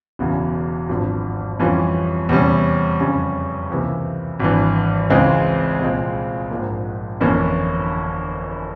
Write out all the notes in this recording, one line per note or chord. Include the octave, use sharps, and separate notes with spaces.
E1 E2 C#3 E3
G#1 G2 F3
F2 E3 G3 C#4 F4
E2 C3 G3 C#4
F2 C#3 G3 C#4
C#2 C3 E3 A#3
G#1 G2 E3
C#2 C#3 E3 G#3 C4
C2 A#2 G#3 C4
A#1 G#2 F3 A#3
G1 F2 E3 A#3 C#4